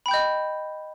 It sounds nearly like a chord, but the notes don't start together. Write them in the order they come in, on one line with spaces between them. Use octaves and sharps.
B5 G5 G6 D#5